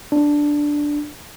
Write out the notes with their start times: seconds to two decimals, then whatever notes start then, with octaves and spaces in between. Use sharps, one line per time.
0.12 D4